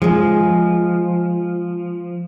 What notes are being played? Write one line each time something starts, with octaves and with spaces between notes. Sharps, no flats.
F3 G#3 G#4